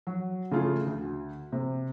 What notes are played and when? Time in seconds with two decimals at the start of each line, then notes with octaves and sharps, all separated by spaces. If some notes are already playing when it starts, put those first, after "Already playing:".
0.07 F#3
0.51 C#3 A3 F4 G#4
0.86 D2
1.52 C3